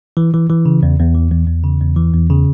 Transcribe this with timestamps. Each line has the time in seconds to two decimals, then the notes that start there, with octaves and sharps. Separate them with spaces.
0.17 E3
0.34 E3
0.50 E3
0.66 C#3
0.83 E2
0.99 E2
1.15 E3
1.31 E2
1.48 E2
1.64 C#3
1.81 E2
1.96 E3
2.14 E2
2.30 C#3